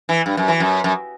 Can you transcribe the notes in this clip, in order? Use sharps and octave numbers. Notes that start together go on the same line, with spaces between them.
E3
G2
F#2
E3
F#2
F#2